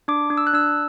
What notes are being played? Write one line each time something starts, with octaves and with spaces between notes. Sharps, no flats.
D4 D6
D4
E6
F#6
D4 E6